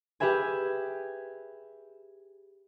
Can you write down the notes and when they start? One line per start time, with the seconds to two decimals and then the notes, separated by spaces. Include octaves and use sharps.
0.20 G4 G#4 B4 E5 G#5